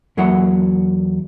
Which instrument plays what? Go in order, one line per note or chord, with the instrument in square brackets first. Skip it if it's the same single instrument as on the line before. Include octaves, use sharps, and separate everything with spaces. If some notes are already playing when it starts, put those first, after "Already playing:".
[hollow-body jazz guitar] E2 F#3 A#3 E4 F#5